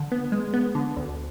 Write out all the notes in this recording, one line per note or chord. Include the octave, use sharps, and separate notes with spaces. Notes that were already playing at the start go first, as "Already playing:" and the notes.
Already playing: D3
B3
G#3
B3
D3
D2